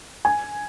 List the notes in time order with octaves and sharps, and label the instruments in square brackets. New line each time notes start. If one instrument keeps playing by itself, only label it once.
[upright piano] G#5